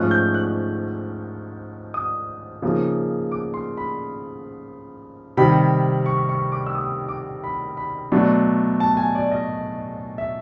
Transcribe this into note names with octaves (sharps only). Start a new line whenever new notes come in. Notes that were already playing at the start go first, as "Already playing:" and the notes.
Already playing: G#2 F3 A3 C#4 F4 F#6
G6
F#6
D#6
C#3 F3 A#3 D#4
D6
C6
B5
C3 D#3 G3 B5
C#6
C#6
D6
E6
D#6
D6
B5
B5
B2 F#3 A3 D4
A5
G#5
D5
D#5
E5